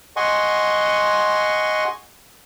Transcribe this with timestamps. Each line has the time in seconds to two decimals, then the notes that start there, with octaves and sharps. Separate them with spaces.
0.16 D#5 F#5 G#5 C6 C#6